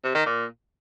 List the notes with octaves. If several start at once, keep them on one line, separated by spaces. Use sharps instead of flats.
C3
D#3
A#2